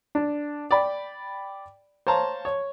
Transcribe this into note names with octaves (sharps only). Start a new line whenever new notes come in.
D4
D5 G5 B5
C5 C#5 F5 A5 A#5
C#5